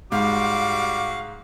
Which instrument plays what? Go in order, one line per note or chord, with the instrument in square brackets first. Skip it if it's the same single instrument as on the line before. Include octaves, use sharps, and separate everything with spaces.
[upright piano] G#2 [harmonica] G3 F#4 D6 [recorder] F5